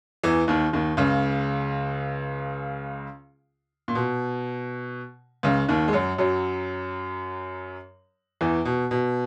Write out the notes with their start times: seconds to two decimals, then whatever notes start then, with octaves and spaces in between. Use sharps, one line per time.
0.23 E2 E3
0.48 D#2 D#3
0.73 D#2 D#3
0.97 C#2 C#3
3.88 A#2
3.95 B2
5.43 C#2 C#3
5.68 D#2 D#3
5.88 G#3
5.93 F#2 F#3
6.18 F#2 F#3
8.41 E2 E3
8.65 B2
8.91 B2